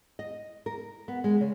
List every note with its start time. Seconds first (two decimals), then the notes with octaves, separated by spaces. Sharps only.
0.19 D#5
0.66 A#4
1.08 B3
1.24 G#3
1.41 C#3